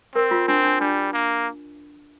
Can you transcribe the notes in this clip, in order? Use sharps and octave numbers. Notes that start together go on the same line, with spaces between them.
C4 A#4
F4
C4 D4
D4
G3 D4
A#3